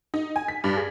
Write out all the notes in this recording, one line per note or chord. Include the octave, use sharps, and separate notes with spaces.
D#4
G#5
B6
G2
G#4